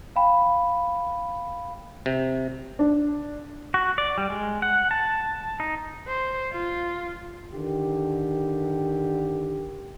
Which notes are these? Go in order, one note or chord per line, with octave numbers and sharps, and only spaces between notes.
F5 G5 B5
C3
D4
F#4
D5
G3
G#3
F#5
A5
D#4
C5
F4
D3 D#3 G4